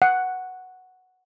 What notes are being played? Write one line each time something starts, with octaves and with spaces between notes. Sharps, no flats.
F#5